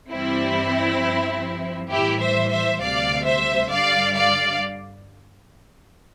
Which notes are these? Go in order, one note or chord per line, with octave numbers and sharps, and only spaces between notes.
G2 E3 G3 C4 E4
G2 F3
A2 E3 G3 E4 G4
C5 E5
C5 E5
D2 C3 G3 D5 F5
C5 E5
G2 D3 G3 D5 F5
D5 F5